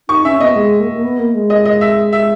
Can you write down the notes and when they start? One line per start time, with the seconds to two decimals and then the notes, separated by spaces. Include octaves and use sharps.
0.09 D#4 C#6
0.25 C#4 E5
0.40 B3 D#5
0.55 G#3
0.80 A#3
0.93 A#3
1.03 B3
1.19 A#3
1.35 G#3
1.50 D#5
1.66 D#5
1.81 E5
2.13 E5